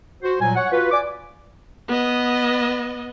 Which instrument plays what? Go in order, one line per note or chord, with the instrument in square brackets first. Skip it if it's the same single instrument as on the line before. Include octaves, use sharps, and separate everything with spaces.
[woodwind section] F#4 C5
A#2 F#3 G3 G#5
C#5 F#5
F4 F#4 B4
D5 G#5 D6
[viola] B3 D#5